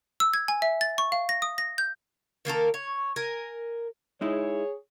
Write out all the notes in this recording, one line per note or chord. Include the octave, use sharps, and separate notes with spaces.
E6
G#6
G#5
E5
A6
C#6
F5
A#6
D#6
A#6
G6
D#3 A#3 A4 A#4
C#5
A#4 G#5
G#3 D#4 E4 G#4 C#5